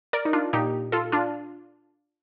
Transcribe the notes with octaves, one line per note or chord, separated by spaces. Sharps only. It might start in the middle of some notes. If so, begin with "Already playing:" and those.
A#4 D5
D#4
D4 F4
A#2 D#4 G4
F4 A4
D4 F4